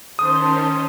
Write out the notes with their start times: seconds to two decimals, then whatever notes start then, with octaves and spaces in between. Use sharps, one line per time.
0.19 D#3 C#4 C5 A5 C6 D#6